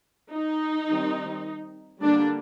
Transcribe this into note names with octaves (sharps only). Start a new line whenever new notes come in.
D#4
D#3 G3 C4
D3 G3 A#3 D4